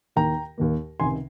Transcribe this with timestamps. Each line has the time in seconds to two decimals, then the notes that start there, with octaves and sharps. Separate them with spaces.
0.16 D#2 D#3 A#3 G5 A#5
0.58 D#2 D#3 A#3
1.00 C#2 C3 D#3 G#5 C6